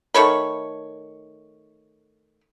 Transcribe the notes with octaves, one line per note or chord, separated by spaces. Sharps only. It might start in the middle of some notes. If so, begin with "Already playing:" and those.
D#3 A3 C#5 B5